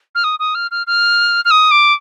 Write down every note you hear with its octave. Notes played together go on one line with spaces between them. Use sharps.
F6
D#6
D#6
F6
F6
F6
F6
D#6
D6